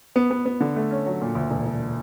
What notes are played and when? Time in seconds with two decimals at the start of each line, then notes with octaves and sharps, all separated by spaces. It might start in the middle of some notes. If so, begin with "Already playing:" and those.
0.16 B3
0.31 B3
0.46 B3
0.60 D3
0.76 A3
0.91 C#4
1.06 F#3
1.21 A#2
1.35 D2
1.51 E1
1.66 E1